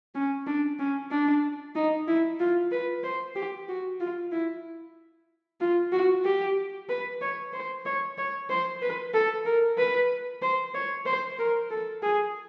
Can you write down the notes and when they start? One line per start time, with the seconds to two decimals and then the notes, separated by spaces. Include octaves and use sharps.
0.15 C#4
0.47 D4
0.79 C#4
1.11 D4
1.75 D#4
2.08 E4
2.40 F4
2.72 B4
3.04 C5
3.35 G4
3.68 F#4
4.00 F4
4.32 E4
5.60 F4
5.92 F#4
6.25 G4
6.89 B4
7.21 C#5
7.53 C5
7.85 C#5
8.18 C#5
8.49 C5
8.82 B4
9.14 A4
9.45 A#4
9.78 B4
10.42 C5
10.74 C#5
11.06 C5
11.39 A#4
11.71 A4
12.02 G#4